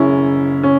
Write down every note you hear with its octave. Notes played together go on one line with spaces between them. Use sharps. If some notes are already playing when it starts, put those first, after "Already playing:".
Already playing: F#1 F#2 C#4 E4 G#4
C#4